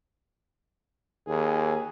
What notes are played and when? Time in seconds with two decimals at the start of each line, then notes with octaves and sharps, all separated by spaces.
1.28 D#2 G#4